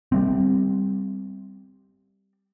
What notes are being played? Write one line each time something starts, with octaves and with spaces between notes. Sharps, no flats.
G3 A#3 C4